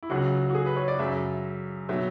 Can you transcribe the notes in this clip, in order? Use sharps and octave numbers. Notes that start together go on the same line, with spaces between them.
E4
C#2 C#3 F#3 F#4
F#4
G#4
B4
C#5
D5
F#2 C#3 F#3 E5
B2 F#3 E5